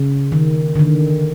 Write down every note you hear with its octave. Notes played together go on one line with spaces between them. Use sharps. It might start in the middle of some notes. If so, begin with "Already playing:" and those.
Already playing: C#3
D#3
D3
D#3